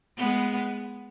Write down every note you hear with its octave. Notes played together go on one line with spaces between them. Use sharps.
G#3 B3